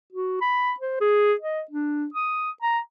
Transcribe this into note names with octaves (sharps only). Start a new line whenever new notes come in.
F#4
B5
C5
G#4
D#5
D4
D#6
A#5